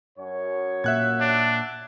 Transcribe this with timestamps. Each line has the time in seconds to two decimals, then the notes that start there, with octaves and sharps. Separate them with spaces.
0.18 F#2 C#5
0.84 A#2 A#3 E5 F#5 F#6 G#6
1.21 D4